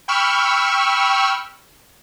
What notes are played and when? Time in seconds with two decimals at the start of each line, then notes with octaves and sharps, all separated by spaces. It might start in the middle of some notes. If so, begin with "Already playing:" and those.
0.08 G5 B5 C#6 E6 F6